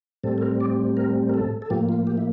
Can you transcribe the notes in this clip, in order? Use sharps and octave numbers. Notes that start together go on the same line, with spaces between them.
A2 G3 C4 A4
A4
A#4
D5
A#4
A#4
A4
A4
A2 F3 A#3 G4
F4
G4
E4